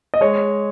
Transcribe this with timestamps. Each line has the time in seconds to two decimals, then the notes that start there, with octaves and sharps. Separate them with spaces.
0.14 D#5
0.21 G#3 C#5